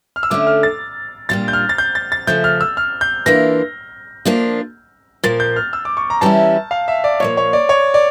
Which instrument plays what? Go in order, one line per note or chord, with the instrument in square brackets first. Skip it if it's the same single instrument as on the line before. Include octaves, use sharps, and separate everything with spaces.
[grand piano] F6
E6
[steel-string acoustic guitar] D3 A3 C#4 [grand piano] D6
[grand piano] F6
A6
[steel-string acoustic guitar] A#2 G3 D4 F4 [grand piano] A6
[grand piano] G6
F6
A6
G6
A6
A6
[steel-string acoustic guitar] C#3 F3 A3 [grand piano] G6
[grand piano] F6
E6
F6
G6
[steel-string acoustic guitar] E3 A#3 D4 F4 [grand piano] A#6
[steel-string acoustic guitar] F3 A#3 D4 F4
[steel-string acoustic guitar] A#2 F3 A#3 [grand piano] A6
[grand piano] G6
F6
E6
D6
C#6
A#5
[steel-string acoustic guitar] E3 G3 C#4 E4 [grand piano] A5
[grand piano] F5
E5
D5
[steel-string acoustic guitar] A#2 F3 A#3 [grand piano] C#5
[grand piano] C#5
D5
C#5
D5